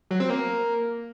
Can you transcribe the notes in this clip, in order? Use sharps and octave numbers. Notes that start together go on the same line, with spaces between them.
F#3
C4
A#3